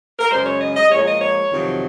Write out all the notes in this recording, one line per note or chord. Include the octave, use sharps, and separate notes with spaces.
A#4
F#2 C#3 G#3 C5
C#5
D#5
D#5
A#2 F3 G#3 C#5
D#5
C#5
F2 C3 D#3 F#3